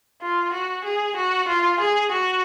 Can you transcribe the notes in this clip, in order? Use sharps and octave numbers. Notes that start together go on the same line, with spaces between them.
F4
F#4
G#4
F#4
F4
G#4
F#4